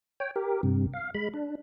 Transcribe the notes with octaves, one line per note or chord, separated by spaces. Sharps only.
C#5 G5
G4 A#4
G2 C3
F5
G#3 B5
D4